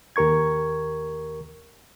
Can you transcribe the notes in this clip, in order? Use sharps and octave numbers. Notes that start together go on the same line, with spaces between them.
D#2 G4 A#4 C#6 G#6